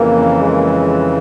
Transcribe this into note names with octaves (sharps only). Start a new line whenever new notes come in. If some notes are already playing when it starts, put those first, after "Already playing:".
Already playing: F2 C#3 E3 A#3
G#3